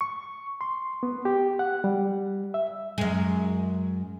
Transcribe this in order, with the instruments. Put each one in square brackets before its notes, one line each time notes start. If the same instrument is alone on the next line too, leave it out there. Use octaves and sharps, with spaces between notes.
[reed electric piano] C#6
C6
B3
G4
F#5
G3
E5
[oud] F#2 G#3